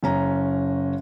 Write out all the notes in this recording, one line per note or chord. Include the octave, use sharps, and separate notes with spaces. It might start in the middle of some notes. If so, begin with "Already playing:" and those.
F#1 C#4 A#5